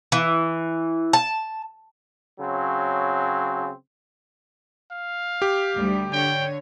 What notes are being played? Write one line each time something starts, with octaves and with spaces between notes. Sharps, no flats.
E3
A5
C#3 F#3 C4
F5
G4
D2 G3
D3 C#5 G5